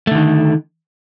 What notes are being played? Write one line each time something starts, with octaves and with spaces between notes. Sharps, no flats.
D3 D#3 A3